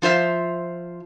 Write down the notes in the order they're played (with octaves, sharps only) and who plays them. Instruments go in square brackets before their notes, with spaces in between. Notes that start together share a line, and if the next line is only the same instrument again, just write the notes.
[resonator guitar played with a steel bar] F3 F4 C5 E5